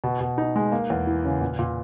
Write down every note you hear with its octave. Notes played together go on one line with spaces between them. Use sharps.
B2
B2
D#4
G#3
A#3
E2
E3
C#3
A#2
A#2